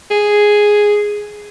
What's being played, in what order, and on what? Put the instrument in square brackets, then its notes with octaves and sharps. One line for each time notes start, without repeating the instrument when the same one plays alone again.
[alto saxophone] G#4